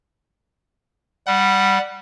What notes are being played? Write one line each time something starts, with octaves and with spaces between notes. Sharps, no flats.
G3 F#5